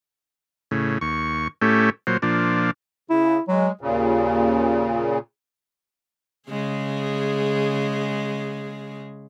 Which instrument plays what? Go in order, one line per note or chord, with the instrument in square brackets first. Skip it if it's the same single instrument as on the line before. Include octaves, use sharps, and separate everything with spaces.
[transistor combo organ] A2 C#3
D#2 C#6
A2 A3 C#4 G4
A#2 F#3 C5
A#2 F3 D4
[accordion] C#3 [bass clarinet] E4
[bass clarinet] F#3 [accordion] G#3
[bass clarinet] D#2 [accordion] A#2 C#3
[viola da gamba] C#3 G#3 G#4